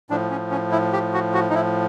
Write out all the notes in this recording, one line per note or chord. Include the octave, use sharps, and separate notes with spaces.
A2 F3 D4
C#4
C#4
E4
G4
F#4
F#4
D#4
E4